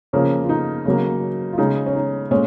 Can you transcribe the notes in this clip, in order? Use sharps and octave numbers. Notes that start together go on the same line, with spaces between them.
C#3 F3 A#3 C#4
F4
D#4
C#3 F#3 A#3
F4
C#3 G#3 D#4
C#4
D#4
A#2 G#3 C#4